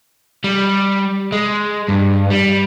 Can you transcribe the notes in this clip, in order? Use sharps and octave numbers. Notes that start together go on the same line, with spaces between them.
G3
G#3
G2
G3